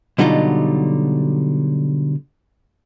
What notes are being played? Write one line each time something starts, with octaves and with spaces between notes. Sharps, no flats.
B2 D3 F#3 G3 D#4 F4